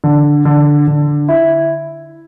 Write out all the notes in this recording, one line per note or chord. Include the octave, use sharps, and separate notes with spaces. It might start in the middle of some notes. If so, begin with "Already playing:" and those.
D3
D3
D3
E4